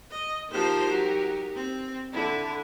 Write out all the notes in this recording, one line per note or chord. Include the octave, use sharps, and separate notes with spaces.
D#5
F3 D#4 G4 A#4 C5
F#3
C4
D3 E4